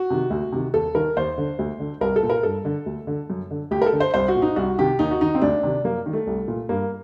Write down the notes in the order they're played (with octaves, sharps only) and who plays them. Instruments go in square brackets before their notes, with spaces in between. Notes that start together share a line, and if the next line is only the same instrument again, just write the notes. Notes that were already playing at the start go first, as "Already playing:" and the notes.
Already playing: [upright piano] F#4
C3 D#3
D2
C3 D#3
D#2 A4
D#3 A#4
D#2 C5
D3
D2
D3
C2 A#4
A4
A#2
A#4
G2 A4
D3
D2
D3
F#2
D3
D2 G4
A#4
A4
D3
C5
C2 C5
F#4
A#2
D#4
C2 F#4
C3 D#3 G4
D#2 D#4
F#4
D#3 D#4
C4
D2 D4
C3 D#3
F#2 A#3
D#3
A3
C2
A#2
G2 A#3